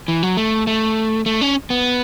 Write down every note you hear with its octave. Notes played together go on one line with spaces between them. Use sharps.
E3
F#3
A3
A3
A3
C#4
B3